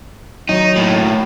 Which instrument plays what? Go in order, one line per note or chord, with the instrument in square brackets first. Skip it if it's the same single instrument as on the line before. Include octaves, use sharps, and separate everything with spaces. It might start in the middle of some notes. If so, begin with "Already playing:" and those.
[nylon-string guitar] D#3 F#3 [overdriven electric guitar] D#4
[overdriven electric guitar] D#2 A2